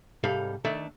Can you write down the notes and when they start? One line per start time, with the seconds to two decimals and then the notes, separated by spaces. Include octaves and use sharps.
0.24 C2 G#2 G3 A4 F5
0.65 D#3 A3 D4 A4